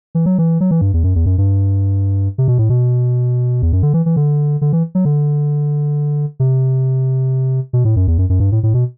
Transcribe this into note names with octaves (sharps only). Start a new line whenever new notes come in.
E3
F#3
E3
F#3
E3
G2
E2
F#2
E2
F#2
G2
C3
B2
A2
B2
E2
F#2
D3
E3
E3
D3
D3
E3
F#3
D3
C3
B2
A2
F#2
E2
F#2
F#2
G2
A2
A2
B2